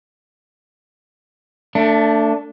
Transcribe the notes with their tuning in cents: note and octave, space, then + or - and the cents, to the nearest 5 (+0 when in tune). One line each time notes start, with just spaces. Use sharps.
A3 +25 D4 -5